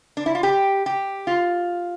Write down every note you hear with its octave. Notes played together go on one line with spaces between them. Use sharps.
D4
E4
F4
G4
G4
F4